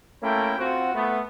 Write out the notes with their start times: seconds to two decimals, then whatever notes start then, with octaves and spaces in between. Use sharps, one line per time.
0.23 A3 A#3 C#4 E4 G5
0.57 C4 F4 F#4
0.94 A3 B3